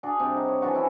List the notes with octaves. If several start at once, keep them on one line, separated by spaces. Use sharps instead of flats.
D4 F#4 G#4
C3 G3
D#4
C#5
E3 F3 D4 F#4
C#4 E4 G#5